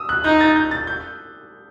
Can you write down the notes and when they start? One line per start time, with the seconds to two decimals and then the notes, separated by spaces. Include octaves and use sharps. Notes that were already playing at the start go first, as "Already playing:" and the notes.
Already playing: D#6 E6
0.09 F#6
0.25 D#4 G6
0.41 A6
0.56 G6
0.71 A6
0.87 G6